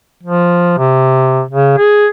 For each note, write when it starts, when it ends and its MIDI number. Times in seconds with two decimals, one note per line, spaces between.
0.23 0.77 53
0.78 1.42 48
1.51 1.75 49
1.78 2.07 68